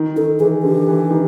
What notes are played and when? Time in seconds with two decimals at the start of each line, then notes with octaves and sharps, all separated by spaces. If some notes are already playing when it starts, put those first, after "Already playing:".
Already playing: D#3
0.16 D#3 A4
0.39 E3 G#4
0.63 D3 G4
0.87 E3
1.11 D#3